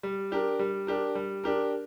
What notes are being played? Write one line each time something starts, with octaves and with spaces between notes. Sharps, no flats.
G3
D4 G4 A#4
G3
D4 G4 A#4
G3
D4 G4 A#4